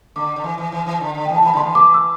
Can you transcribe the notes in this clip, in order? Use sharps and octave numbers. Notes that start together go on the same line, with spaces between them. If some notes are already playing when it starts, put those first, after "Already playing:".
D3 D6
D3
E3
E3
E3
E3
D3
D3
E3 G5
A5
E3 B5
D3 C6
E3
D6
E6